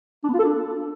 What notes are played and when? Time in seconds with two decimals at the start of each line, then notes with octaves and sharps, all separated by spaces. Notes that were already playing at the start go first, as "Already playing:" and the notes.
0.24 D4
0.29 B3
0.34 F4
0.39 A4
0.44 D4